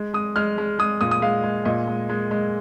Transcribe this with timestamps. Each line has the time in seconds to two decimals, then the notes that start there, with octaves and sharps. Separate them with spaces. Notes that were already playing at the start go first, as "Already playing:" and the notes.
Already playing: G#3
0.14 G#3 D#6
0.36 G#3 F6
0.58 G#3
0.79 G#3 D#6
1.01 A#2 D#6
1.11 D#6
1.22 G#3 F5
1.44 G#3
1.65 A#2 D#5
1.88 G#3
2.09 G#3
2.31 G#3